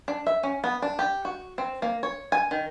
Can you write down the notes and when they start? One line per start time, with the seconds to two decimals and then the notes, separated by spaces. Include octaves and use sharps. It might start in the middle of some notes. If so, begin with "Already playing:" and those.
0.08 D4
0.27 E5
0.43 C#4
0.64 B3
0.82 D4
0.99 G4
1.25 F#4
1.58 C4
1.82 A#3
2.03 C#5
2.32 G#5
2.51 D#3